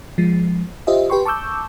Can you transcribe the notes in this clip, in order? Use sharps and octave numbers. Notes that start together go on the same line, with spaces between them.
F3 G#3
F4 G4 C5 D#5 E5
G4 B4 G5 C6 C#6
A5 C#6 D6 E6 G6